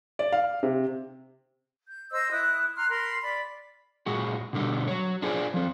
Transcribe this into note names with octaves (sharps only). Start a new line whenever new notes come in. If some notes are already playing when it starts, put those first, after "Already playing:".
D5
F5
C3
G6
C5 D#5 E6 G6
E4 D#6 F#6
A#5 C6 F6 F#6
A#4 B5 C6
D5 B5
A#2 G#3 F#4
B2 D3 F#3 G3 G4 A4
F#3 C#5
D4 F4 G#4 C5 D5
F3 C4